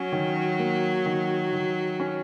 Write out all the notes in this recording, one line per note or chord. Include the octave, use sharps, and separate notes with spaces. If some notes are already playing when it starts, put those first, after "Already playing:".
Already playing: F#3 C#4
D#3
A#3
D#3
D#3
C#4